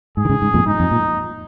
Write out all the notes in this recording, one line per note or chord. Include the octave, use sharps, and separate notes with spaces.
G#2 G#4
D#3
G#2 C#3
G#2
F2 A#2
G#2 D#4
F2
A#2